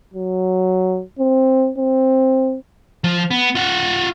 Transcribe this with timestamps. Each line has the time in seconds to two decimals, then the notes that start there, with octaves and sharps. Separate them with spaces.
0.14 F#3
1.19 C4
1.79 C4
3.04 F3
3.31 B3
3.55 F4 F#5